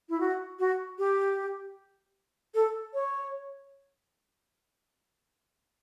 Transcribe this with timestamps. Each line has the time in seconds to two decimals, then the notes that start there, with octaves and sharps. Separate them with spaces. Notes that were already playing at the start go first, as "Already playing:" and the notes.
0.10 E4
0.20 F#4
0.59 F#4
0.99 G4
2.55 A4
2.94 C#5